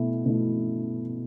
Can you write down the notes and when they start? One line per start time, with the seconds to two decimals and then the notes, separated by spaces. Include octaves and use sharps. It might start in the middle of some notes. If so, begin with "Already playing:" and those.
Already playing: B2 A3 E4
0.26 B2 A3 E4